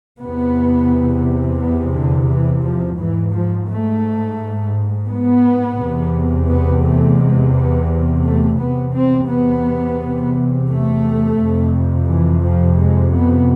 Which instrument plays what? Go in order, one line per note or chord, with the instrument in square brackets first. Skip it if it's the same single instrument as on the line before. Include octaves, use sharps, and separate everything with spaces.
[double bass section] E2 C3 B3
B3
D3
E3
F3
G#2 E3
F3
A3
B3
E2 C3
B3
A3
G#3
B3
A3
E2 C3 B3
C4
B3
A3
F2 C3
E3
F3
G#3
B3